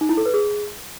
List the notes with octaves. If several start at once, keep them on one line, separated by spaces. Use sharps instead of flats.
D#4
E4
A4
B4
G#4